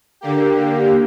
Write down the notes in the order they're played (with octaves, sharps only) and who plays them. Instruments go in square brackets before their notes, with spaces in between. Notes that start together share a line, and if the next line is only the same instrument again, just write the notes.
[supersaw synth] D3 A#3 G4